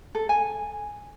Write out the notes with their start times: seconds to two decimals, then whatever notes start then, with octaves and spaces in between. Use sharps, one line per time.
0.15 A4
0.29 G#5